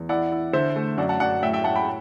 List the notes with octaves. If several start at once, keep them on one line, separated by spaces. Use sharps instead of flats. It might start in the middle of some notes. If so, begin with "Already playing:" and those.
Already playing: E2
E4 D5 F#5
E4
D3 C5 E5
A3
F#2 D5 F#5
F#5 A5
F#2 D5 F#5
A2 E5 G5
E5 G5
A2 F#5 A5
G5 B5